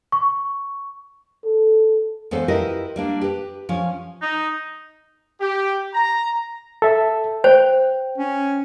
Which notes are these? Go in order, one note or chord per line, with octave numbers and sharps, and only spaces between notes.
C#6
A4
E2 B3 A4 C5 F5
E4 F4 G4 A#4 B4 D#5
G3 A#3 D4
G4 B4
F3 C#4
D#4
G4
A#5
A4 E5
C5 G5
C#4